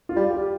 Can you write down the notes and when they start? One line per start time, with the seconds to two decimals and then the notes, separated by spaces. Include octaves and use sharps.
0.09 F4
0.16 G3
0.31 G4